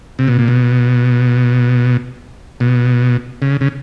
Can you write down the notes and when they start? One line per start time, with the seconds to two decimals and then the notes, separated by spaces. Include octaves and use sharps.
0.19 C3
0.28 B2
0.39 A#2
0.48 B2
2.60 B2
3.42 C#3
3.61 C#3